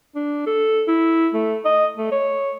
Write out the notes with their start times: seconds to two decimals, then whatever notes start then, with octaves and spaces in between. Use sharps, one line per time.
0.15 D4
0.46 A4
0.88 E4
1.34 A3
1.65 D#5
1.97 A3
2.12 C#5